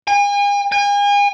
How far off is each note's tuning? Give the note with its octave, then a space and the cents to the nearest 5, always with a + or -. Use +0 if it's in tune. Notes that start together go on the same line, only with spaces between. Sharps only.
G#5 -40
G#5 -40